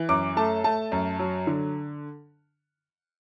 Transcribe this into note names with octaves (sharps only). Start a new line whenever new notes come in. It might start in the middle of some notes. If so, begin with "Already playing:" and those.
Already playing: E3
F#2 D6
A3 A5
A3 A5
F#2
F#3
D3